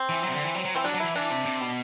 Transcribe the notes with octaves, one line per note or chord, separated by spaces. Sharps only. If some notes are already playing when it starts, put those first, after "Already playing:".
Already playing: C4
E3
C3 F#3
D3
E3
F#3
F#3
E3 C4
F#3 D4
F#3
E3 E4
E3 D4
C3
C3
B2